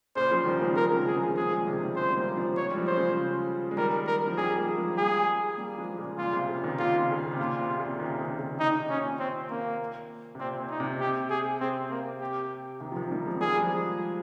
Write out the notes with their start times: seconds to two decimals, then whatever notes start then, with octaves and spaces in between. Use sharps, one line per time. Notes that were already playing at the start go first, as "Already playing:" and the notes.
0.16 A#2 C#3 C5
0.31 C#3 F3
0.46 D#3 G3
0.62 F3 G#3
0.76 C#3 F3 A#4
0.96 C3 D#3
1.07 G#4
1.16 F3 G#3
1.36 F3 G#3 G#4
1.51 A#2 C#3
1.67 C3 D#3
1.81 D#3 G3
1.96 F3 G#3 C5
2.16 G3 A#3
2.28 A#3
2.37 F3 G#3
2.57 C#5
2.71 G3
2.77 F3 G#3
2.87 C5
2.97 C#3 F3
3.71 G#3
3.77 D#3 G3 A#4
4.07 A#4
4.27 F3
4.37 D#3 G3 G#4
4.57 G3 A#3
4.78 F3 G#3
4.98 G3 A#3 G#4
5.58 G3 A#3
5.78 F3 G#3
5.98 A#2 C#3
6.18 A#2 F4
6.33 C3
6.49 A#2 C#3
6.64 C3 D#3
6.79 A#2 C#3 F4
6.95 A#2
6.99 C3
7.11 C#3
7.19 C3
7.31 C3
7.39 A#2 F4
7.59 C3
7.79 A#2 C#3
8.00 C3 D#3
8.19 A#2 C#3
8.39 A#2 C#3
8.59 A#2 D#4
8.80 C3
8.90 C#4
8.99 A#2
9.19 C4
9.50 A#3
10.35 C3
10.39 A#2 C4
10.60 A#2
10.70 D#4
10.80 C3
11.01 G4
11.30 G#4
11.61 C3 C4
11.91 A#3
12.21 G4
12.80 C3 D#3
12.92 F3
12.95 C3 D#3
13.12 D#3 G3
13.26 F3 G#3
13.41 G3 A#3 G#4
13.61 F3 G#3